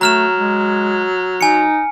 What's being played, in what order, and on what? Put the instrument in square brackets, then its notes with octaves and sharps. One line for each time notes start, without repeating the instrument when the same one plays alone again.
[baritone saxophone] F#3 [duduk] A3 [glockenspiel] A#5 F6 E7
[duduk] G#3
[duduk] D#4 [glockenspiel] G#5 C#7